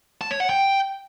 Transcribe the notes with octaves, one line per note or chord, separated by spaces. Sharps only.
A5
C#5
F#5
G5